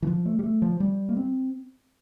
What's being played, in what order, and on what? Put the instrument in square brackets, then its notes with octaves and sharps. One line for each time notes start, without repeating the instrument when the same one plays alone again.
[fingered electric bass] E3
F3
A3
G3
A3
F3
G3
A#3
C4